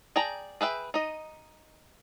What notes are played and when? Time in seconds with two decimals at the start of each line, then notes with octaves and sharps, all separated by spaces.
0.16 G#4 D5 G5 A5 A#5
0.61 G#4 B4 E5 G5
0.94 D#4 D#5